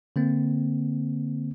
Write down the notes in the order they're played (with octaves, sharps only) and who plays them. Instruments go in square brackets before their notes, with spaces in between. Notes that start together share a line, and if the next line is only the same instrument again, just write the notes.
[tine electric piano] D3 A#3 C4